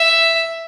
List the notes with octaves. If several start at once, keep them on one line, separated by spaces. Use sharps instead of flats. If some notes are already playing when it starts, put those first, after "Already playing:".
Already playing: E5